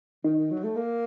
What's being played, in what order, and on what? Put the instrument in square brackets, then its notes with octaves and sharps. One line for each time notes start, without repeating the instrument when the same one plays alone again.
[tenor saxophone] D#3 [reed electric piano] D#4
[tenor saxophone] D#3
F#3
A3
A#3